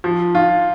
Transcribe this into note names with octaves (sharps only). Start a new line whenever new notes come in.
F3
F4